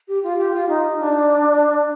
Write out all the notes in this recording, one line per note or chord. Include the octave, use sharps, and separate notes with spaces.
G4
F4
G4
F4
D#4
D4